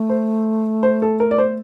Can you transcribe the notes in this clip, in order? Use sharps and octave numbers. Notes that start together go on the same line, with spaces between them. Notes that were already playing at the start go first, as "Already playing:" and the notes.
Already playing: A3
C5
C5
A4
A#4
D5
C5